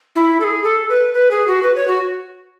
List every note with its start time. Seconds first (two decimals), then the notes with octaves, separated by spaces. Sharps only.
0.15 E4
0.40 A4
0.44 G#4
0.64 A4
0.89 B4
1.14 B4
1.31 G#4
1.47 F#4
1.63 B4
1.75 C#5
1.88 F#4